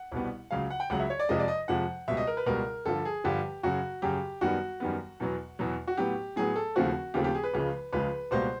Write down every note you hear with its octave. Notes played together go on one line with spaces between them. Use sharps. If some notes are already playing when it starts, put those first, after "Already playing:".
Already playing: F#5
C2 B2 G3 B3
C#2 C#3 F#3 F5
F#5
G5
C#2 C#3 F#3 F#5
E5
C#5
D5
F2 C3 F3 G#3 D#5
D5
D#5
F2 C3 F3 G#3 F#5
C#2 B2 G3 E5
D#5
A#4
B4
C#2 B2 G3 A#4
G2 D3 F3 A4
G#4
G2 D3 F3 G4
F#2 C#3 F#3 F#4
F#2 C#3 F#3 G4
F#2 D#3 G3 B3 F#4
F#2 D#3 G3 B3
E2 B2 F#3 B3
E2 B2 F#3 B3
F#4
A2 F#3 B3 G4
A2 F#3 B3 G#4
A4
D#2 C#3 F3 A3 C4 F#4
D#2 C#3 F3 A3 C4 G4
G4
G#4
B4
C#2 C#3 F3 G#3
C#2 C#3 F3 G#3 B4
C#2 B2 G3 A#3 C5